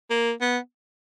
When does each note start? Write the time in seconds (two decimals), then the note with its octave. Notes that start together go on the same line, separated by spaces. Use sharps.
0.10 A#3
0.41 B3